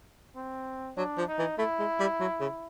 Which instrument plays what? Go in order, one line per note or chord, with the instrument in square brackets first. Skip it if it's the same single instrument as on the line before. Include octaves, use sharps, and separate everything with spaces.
[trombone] C4
[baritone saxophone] F#3 [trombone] D4
[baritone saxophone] F3
[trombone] D#4
[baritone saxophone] E3
[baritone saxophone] A3 [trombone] E4
[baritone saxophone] G#3
G3
F#3
C#3